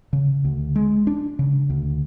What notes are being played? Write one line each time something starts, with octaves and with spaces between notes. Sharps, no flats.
C#3
D2
G#3
D4
C#3
D2